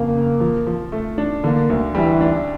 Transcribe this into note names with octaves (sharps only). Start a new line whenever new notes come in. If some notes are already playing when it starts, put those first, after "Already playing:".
Already playing: F2 C#3 A#3
C#3
F3
F3
A3
D4
D3 A#3
D2
E3 G3
D4